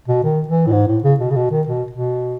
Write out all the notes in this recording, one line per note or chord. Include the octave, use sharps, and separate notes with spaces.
B2
D#3
E3
A2
G#2
A2
C#3
B2
C#3
B2
D#3
B2
B2